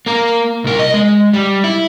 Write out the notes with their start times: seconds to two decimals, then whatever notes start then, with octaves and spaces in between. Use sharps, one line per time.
0.06 A#3 A#4
0.64 C2 A#4
0.79 D#5
0.94 G#3
1.33 G3
1.64 E4